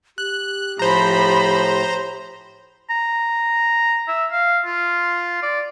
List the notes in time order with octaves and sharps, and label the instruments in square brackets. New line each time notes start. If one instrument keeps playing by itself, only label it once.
[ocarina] G4 [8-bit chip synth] F#6
[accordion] A2 [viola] F3 B5 [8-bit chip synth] C5 A#5
[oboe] A#5
E5
F5
F4
D5